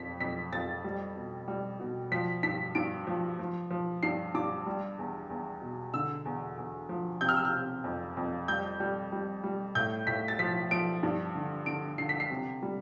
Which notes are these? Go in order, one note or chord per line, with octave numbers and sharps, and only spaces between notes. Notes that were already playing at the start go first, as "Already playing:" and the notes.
Already playing: F2 F3 B6
F2 B6
F2 A6
G3
B2
G3
B2
F3 B6
G2 B6
G2 D7
F3
F3
F3
G2 C7
G2 D6
G3
E2
E2
B2
D3 E6
E2
E2
F3
C3 G6
F6
E6
F6
C3
F2
F2
G3 G6
G3
G3
G3
A2 G6
A2 B6
A6
F3 B6
F3 D7
G2
D3
D3 D7
D3 C7
B6
C7
C3
G3